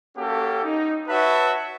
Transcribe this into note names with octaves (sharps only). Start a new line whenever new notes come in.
A#3 C#4 F#4 G4 A4
D#4
F#4 B4 C#5 E5 F#5 A5